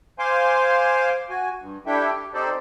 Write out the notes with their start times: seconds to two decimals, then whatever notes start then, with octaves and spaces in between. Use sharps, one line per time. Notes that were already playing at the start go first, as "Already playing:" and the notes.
0.19 C5 F5 G#5 C6 D6
1.30 F#4 G#5
1.60 G2
1.86 D4 E4 G4 A4 E5 G5
2.12 G4
2.34 C4 D#4 G4 A4 C5 D5